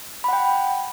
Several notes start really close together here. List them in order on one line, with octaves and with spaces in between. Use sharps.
B5 F#5 G5